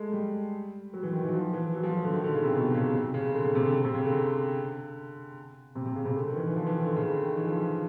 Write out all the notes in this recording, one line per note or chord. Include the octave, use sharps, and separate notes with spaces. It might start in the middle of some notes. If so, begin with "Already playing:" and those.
Already playing: G#3 A3
G3
F#3
E3
D#3
E3
F#3
F3
E3
F#3
F3
F#3
D3
D#3
D3
C#3
C3
B2
C#3
C3
C#3
D3
C#3
C3
D3
C3
C#3
D3
C3
C3
C#3
C3
D3
D#3
E3
E3
F3
E3
D#3
D3
C#3
D3
D#3
E3
F3